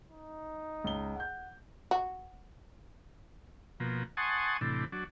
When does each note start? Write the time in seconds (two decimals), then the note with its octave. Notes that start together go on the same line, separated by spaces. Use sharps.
0.11 D#4
0.84 C#2 G7
1.16 F#5 G6
1.91 F#4
3.80 B2 F3 A#3
4.17 F#5 G#5 A5 C6 C#6 D#6
4.61 A2 C3 E3 D4
4.92 F#3 D4